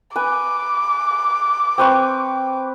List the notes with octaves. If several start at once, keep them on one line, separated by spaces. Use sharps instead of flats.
B4 G#5 D6
C4 B4 C#6